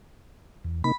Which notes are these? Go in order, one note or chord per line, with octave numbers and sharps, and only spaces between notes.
E2
C3 A#3 D#4 B5